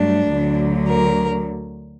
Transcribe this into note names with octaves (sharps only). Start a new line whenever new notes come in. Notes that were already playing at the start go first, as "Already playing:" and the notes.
Already playing: G2 F#3 A3 D4
D2 D3 F#3
A#4